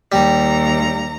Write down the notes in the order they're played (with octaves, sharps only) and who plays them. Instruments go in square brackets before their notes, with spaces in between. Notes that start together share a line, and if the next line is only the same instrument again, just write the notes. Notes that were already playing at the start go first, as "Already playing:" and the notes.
[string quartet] D#2 A#5 [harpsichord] G3